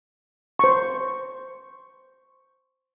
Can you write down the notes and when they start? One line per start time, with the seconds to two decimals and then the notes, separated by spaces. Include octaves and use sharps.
0.59 C5 C#6